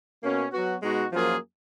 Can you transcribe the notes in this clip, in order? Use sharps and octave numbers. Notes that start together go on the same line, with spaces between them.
B2 A#3 C#4
F#3 B3 F#4
B2 G#3 D#4 F#4
F#2 F3 A#3 F4 G#4